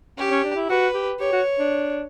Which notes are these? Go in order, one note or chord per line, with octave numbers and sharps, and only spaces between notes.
C#4 G4
C#4
D4
E4
F#4 B4
G4
G4 C#5
F#4
D4